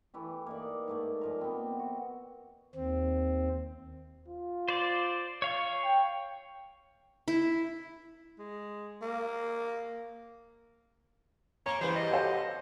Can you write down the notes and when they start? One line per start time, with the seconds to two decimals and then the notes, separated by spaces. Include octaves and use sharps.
0.14 E3 A3 G4
0.47 A#3 D#4 D5
0.88 G#2 A3 A#3
1.21 A#2 F3 A#5
1.41 B3 C4
1.79 F#4
2.75 D#2 C4
4.28 F4
4.68 C5 D5
5.42 C#5 F5 C#6
5.84 G5
7.28 E4
8.39 G#3
9.02 A#3
11.66 A#3 C#5 A#5
11.81 C#3 E3 G3 B4 C5
11.95 D#5
12.10 F#4 A4 C5